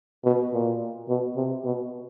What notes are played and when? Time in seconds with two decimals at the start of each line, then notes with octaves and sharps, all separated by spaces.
0.25 B2
0.53 A#2
1.09 B2
1.36 C3
1.65 B2